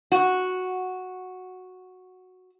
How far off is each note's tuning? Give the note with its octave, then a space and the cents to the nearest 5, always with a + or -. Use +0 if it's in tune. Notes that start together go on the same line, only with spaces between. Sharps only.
F#4 -5